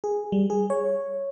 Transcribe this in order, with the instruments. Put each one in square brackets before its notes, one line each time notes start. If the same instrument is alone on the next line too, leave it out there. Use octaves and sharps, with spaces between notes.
[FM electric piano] G#4
G3
G#4
C#5